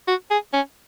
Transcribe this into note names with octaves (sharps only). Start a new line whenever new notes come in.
F#4
G#4
C#4